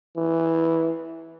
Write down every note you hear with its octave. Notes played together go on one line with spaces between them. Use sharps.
E3